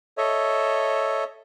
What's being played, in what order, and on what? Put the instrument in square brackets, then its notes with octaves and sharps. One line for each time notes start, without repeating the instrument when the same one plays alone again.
[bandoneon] A4 C#5 D#5 E5